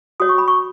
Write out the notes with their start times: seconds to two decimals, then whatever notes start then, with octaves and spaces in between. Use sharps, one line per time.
0.20 F#4 C#5 D#6
0.29 C#6
0.38 B5
0.48 C#6